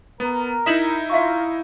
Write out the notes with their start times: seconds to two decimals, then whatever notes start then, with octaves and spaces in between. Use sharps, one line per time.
0.20 B3 A#4 A#5
0.66 D#4 E4 D#5 B6 E7 F#7
1.10 F4 E5 F5 C#6